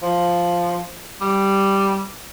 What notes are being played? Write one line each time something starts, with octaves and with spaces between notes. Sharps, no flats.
F3
G3